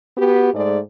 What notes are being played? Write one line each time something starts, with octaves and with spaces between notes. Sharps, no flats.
B3 F#4 G4
G#2 G#3 A3 D5